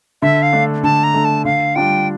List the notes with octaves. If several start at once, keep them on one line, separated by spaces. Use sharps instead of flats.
D3 E5
F5
A3 D4
D3 A5
A#5
A3 D4
A5
D3 F5
G3 D4 F4 G5